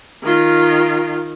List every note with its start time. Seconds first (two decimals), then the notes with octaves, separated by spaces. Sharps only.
0.23 D#3 F4